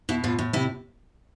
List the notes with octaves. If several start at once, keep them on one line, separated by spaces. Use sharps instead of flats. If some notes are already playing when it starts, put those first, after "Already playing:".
B2 E4
A2 F4
A2
C3 E4